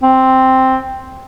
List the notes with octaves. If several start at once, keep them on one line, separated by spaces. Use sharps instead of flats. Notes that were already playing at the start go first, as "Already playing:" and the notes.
C4